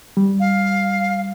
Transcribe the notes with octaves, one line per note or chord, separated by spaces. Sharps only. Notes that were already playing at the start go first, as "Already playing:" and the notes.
G3
F5